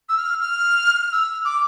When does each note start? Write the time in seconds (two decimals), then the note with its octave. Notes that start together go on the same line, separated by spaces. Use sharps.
0.09 E6
0.17 F6
0.41 F6
1.12 E6
1.45 D6